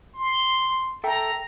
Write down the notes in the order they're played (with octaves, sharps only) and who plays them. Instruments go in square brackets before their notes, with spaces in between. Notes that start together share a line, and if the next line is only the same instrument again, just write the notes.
[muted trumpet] C6
[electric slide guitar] A4 E5 G5 [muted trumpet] A#5